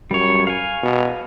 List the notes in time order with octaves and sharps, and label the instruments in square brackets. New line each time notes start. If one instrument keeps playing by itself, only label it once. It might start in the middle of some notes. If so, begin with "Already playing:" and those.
[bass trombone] F#2 [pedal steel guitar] G3 C#5
[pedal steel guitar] F5 G#5
[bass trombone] B2